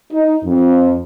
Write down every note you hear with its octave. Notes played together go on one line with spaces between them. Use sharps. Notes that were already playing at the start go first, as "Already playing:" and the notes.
D#4
F2